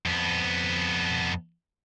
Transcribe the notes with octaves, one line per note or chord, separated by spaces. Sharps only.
F2 B3